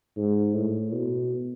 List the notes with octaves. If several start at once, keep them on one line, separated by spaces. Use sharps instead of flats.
G#2
A2
B2